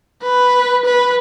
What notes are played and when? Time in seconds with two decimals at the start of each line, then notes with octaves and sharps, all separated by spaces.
0.22 B4
0.85 B4